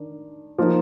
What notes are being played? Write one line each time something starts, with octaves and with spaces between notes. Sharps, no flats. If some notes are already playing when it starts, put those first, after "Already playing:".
Already playing: D#3 D4
F3 A#3 D#4